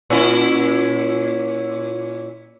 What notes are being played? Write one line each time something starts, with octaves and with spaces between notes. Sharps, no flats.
A#2 C#4 E4